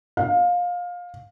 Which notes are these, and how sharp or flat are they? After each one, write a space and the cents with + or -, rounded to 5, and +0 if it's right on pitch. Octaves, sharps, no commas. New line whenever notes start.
F5 +20